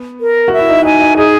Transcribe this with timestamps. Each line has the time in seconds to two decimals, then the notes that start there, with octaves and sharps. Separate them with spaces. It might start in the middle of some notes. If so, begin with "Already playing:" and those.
Already playing: B3
0.21 A#4
0.48 F#4 E5
0.59 E4
0.69 D#4
0.85 D#4 G#5
1.02 D#4
1.17 D#4 G#4